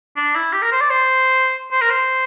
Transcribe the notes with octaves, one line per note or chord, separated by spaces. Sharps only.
D4
E4
G4
A#4
C5
D5
C5
C5
A#4
C5